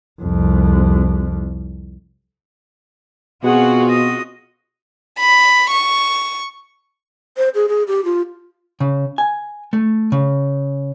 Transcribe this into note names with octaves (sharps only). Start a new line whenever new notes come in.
C2 F2
B2 C4 F4 F#4 G#4 F#5
D#5
B5
C#6
C5
G#4
G#4
G4
F4
C#3
G#5
A3
C#3